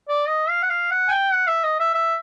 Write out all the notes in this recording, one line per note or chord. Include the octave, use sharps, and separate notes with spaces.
D5
D#5
F5
F#5
F5
F#5
G#5
G5
F#5
E5
D#5
E5
E5